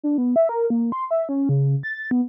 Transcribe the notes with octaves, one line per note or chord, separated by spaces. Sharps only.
D4
B3
E5
A#4
A#3
C6
E5
C#4
C#3
A6
B3